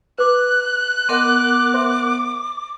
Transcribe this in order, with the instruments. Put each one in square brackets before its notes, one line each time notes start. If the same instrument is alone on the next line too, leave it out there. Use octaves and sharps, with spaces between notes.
[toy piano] B4 D6 [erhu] F#6
[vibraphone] B3 A#4 F#5 [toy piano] D#5 G5 C6 [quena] D6
[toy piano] C5 E5 C6